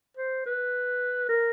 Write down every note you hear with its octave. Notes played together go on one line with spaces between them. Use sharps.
C5
B4
A#4